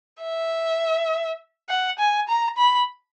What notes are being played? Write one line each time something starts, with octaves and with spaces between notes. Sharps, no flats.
E5
F#5
G#5
A#5
B5